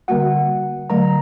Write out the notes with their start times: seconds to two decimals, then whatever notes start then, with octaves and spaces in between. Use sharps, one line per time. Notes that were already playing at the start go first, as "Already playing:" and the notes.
0.08 D3 G3 A#3 F#4 F#5
0.90 D3 F#3 A3 A#5